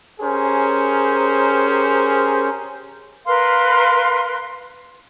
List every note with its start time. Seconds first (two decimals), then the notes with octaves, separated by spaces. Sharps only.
0.20 C#4 G4 G#4 A#4 C5
3.26 A#4 B4 F5 C6